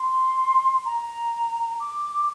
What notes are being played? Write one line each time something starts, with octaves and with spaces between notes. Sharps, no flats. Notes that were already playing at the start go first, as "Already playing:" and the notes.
Already playing: C6
A#5
D6